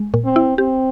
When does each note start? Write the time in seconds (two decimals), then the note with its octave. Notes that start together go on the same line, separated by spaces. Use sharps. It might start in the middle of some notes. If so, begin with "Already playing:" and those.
Already playing: G#3
0.14 A#2
0.25 C4
0.36 E4
0.58 C4 G4